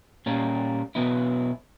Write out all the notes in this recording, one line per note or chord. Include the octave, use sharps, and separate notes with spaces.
A#2 G3 A#3 C#4
B2 F#3 B3 E4